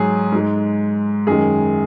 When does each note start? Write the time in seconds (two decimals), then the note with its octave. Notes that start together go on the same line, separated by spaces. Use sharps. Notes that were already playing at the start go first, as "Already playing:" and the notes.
Already playing: G#2 F#3 G#4
0.32 G#2 G#3
1.27 F#2 D#3 G#3 G#4